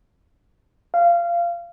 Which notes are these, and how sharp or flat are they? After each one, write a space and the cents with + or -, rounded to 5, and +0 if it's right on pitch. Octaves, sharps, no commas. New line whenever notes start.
F5 -20